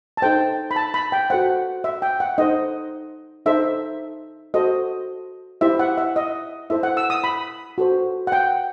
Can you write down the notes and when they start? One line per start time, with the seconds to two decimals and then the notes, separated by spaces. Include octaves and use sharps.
0.17 A5
0.22 D#4 A4 C5 G5
0.71 B5
0.76 A5
0.94 B5
1.12 G5
1.30 F#4 A4 C5 F#5
1.84 E5
2.02 G5
2.20 F#5
2.38 D#4 A4 C5 D#5
3.46 D#4 A4 C5 E5
4.54 F#4 A4 C5 D#5
5.61 E4 G4 C5 E5
5.79 F#5
5.97 E5
6.16 D#5
6.70 E4 A4 C5 E5
6.83 F#5
6.97 E6
7.10 D#6
7.24 B5
7.78 F#4 A4 C5
8.27 F#5
8.32 G5